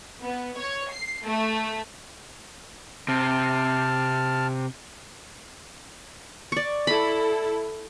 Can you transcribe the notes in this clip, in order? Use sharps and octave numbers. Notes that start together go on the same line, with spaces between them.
B3
C#5
C7
A3
C3 A5 F6
D5 C#6
E4 A4 B5